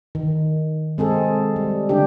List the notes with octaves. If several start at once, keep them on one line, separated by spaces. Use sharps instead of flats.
D#3
G#3 C4 G#4 A4
G3
D3 D4 G4